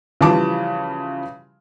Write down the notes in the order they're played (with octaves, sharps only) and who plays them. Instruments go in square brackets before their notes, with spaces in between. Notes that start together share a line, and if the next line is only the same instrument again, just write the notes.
[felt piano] C#3 E3 F3 G3 A5 D6